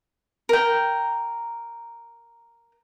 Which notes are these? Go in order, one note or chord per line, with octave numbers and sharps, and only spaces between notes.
A#4 G5